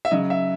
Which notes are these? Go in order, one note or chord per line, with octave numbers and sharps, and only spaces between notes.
E5
C#3 F#3 D#5
E5